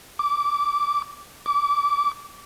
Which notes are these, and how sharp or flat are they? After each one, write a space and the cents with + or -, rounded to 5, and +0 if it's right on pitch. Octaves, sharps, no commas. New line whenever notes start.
D6 -15
D6 -25